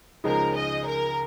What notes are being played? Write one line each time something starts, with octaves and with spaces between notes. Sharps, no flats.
C#2 C#3 F3 G#3 D#4 A#4
D#5
A#4